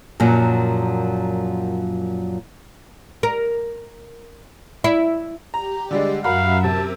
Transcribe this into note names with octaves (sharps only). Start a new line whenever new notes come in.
F#2 A#2 F3 F#3
A#4
E4
G4 A#5
D3 G3 G#3 D5
F#2 F#4 A#4 E5 F5 B5
C3 A#4 A5